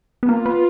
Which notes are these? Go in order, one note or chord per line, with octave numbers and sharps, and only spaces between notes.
B3
A#3 F4
B3